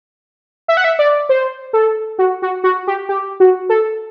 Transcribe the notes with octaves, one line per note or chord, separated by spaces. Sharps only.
E5
F#5
E5
D5
C5
A4
F#4
F#4
F#4
G4
G4
F#4
A4